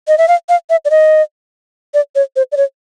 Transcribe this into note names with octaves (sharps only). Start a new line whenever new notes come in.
D#5
E5
F5
F5
E5
D5
D#5
D5
C#5
C5
D5
C#5